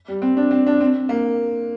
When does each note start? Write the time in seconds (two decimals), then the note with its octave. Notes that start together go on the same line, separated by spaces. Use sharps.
0.08 G3
0.22 C4
0.37 D4
0.51 C4
0.67 D4
0.81 C4
1.09 A#3